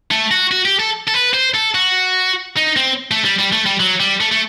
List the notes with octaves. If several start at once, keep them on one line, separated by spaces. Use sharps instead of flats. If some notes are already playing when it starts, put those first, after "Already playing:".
A3
F#4
F#4
G4
A4
A4
B4
C5
A4
F#4
D#4
C4
A3
G3
G3
A3
G3
F#3
G3
A3
A3